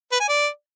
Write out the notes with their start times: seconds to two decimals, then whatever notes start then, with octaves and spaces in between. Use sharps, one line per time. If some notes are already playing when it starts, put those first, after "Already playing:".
0.12 B4
0.20 G#5
0.28 D5